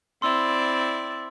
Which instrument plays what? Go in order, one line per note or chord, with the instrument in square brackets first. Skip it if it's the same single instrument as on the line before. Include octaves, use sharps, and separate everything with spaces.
[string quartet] C4 E4 D5 [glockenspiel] C6 E6